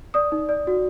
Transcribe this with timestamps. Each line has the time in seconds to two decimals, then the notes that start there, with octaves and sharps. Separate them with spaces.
0.14 D5 D#6
0.32 D#4
0.49 D5
0.67 F#4